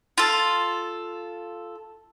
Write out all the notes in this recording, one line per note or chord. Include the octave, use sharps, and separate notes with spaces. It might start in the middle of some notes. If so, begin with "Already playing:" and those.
F4 A4